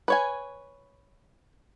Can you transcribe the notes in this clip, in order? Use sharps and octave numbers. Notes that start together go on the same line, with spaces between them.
B4 C#5 G#5